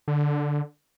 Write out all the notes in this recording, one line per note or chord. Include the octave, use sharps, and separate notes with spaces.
D3